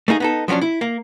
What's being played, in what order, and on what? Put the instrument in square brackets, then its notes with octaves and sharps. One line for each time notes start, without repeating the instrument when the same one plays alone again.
[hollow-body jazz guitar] A3 A#3 D#4 G#4
B3 D#4 A4
F3 F#3 B3 C#4 D4
E4
A#3